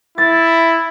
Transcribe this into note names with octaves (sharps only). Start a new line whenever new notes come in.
E4 A6